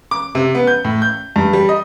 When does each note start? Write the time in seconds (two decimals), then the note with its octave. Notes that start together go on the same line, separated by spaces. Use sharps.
0.11 D6
0.35 C3
0.55 B3
0.67 G6
0.84 A2
1.02 G6
1.36 G2
1.53 G3
1.69 D#5